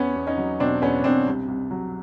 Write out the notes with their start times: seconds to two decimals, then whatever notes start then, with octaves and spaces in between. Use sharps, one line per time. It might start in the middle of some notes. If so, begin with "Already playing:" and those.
Already playing: E2 B3 C#4
0.16 E2
0.27 C#4 D#4
0.38 F#3
0.60 B2 C4 D4
0.82 E2 B3 C#4
1.04 E2 C4 D4
1.26 C2
1.48 C2
1.71 F#3